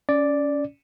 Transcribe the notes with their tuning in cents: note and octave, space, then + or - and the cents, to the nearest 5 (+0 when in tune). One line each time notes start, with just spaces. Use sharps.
C#4 +20 D5 +0